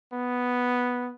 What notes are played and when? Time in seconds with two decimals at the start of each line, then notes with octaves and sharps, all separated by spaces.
0.13 B3